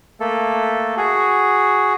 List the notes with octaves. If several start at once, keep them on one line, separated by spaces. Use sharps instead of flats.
A3 A#3 A4
F#4 G#4